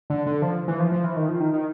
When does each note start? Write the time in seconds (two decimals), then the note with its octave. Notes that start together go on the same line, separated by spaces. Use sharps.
0.10 D3
0.27 D3
0.42 F3
0.68 E3
0.80 F3
0.92 F3
1.04 E3
1.16 D#3
1.29 F3
1.40 D#3
1.53 D#3